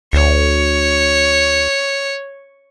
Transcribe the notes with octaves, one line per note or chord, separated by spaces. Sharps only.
D2 C#5